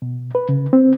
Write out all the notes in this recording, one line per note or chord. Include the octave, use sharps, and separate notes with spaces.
B2
B4
C#3
C4